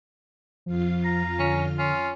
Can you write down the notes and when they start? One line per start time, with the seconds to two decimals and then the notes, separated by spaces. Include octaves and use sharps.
0.66 F2 F3 F4 F5
1.05 A#5
1.39 D3 C#4
1.79 C#4 F4